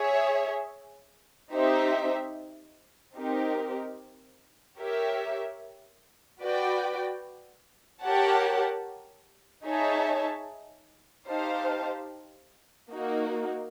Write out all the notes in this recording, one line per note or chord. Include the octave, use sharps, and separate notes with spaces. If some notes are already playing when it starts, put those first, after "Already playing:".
Already playing: G#4 C#5 E5
C4 D#4 G4 C5 E5
C4 D#4 G4 A#4
G4 A#4 C#5 E5
F#4 B4 D5 G5
G4 A#4 C#5 F#5 A5
D#4 G#4 C#5 E5 A5
D#4 G4 C5 F5 A5
A#3 D#4 F#4